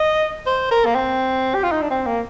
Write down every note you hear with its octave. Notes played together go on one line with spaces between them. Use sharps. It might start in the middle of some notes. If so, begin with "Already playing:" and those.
Already playing: D#5
C5
A#4
A#3
C4
G4
F4
D#4
D4
C4
A#3